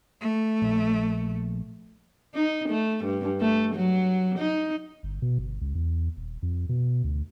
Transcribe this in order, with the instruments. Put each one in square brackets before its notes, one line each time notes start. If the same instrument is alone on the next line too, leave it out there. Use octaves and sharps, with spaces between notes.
[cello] A3
[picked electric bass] A#1
[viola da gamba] D#4
A3
G2
A3
F#3
D#4
[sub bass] G1
B2
G1
C#2
E2
D#1
F2
B2
D2